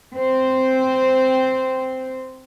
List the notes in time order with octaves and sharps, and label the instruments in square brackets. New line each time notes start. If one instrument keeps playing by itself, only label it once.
[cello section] C4 C5